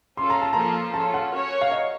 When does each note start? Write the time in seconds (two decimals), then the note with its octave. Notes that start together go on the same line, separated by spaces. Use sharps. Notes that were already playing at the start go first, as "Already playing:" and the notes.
0.17 C#4 F4 A4 C6
0.30 A#5
0.42 A5
0.53 F3 A#3 F4 A4 A#5
0.94 C#4 F4 A4 A5
1.14 F#5
1.32 C#4 F#4 A#4 C#5
1.61 F5
1.72 D#5